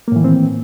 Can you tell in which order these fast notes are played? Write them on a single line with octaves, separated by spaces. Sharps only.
A#3 A2 E3 D#3 C4